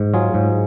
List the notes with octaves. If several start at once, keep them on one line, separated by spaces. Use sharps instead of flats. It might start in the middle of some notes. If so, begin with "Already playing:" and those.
Already playing: G#2
F#3 F4 G#4
G#2